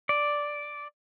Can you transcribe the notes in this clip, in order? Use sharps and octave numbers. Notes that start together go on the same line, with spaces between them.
D5